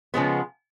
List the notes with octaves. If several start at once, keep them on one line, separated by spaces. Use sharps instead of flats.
C#3 F3 G#3 B3